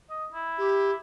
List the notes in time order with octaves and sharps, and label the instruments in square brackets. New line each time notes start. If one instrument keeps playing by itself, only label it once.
[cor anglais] D#5
E4
[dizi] G4